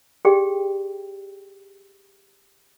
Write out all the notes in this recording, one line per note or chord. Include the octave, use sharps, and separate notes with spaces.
G4 G#4 D5 G5